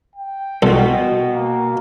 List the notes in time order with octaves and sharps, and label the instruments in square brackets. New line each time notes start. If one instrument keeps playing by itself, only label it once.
[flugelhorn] G5
[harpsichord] C2 A4 [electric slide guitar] B2 F#4
[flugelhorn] A#3